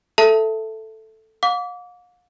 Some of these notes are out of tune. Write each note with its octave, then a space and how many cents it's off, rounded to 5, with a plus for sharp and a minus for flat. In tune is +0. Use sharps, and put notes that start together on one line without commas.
A4 +0 E5 +5 A5 +20
F5 +45 D6 -30